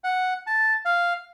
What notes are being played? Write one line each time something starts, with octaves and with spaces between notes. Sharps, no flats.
F#5
A5
F5